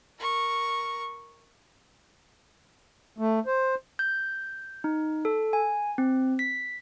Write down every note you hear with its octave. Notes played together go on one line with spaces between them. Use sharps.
A#4 C#6
A3
C5
G6
D#4
A4
G#5
C4
B6